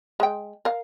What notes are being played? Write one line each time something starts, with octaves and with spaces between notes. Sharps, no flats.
G#3 G5
A#4 F5